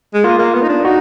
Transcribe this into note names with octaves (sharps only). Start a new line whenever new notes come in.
G#3
A#3 F4
A#3
B3
D#4
D4
D#4 F#4